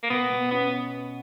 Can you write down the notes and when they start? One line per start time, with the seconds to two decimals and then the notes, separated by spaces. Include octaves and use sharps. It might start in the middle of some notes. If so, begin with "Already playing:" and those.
0.03 A#3
0.10 B2 B3
0.30 B2
0.51 B3 C#4